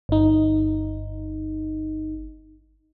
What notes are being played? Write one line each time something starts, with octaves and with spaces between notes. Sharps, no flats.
G1 D#4